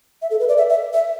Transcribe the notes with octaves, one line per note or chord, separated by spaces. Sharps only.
E5
A4
B4
D5
E5
E5
E5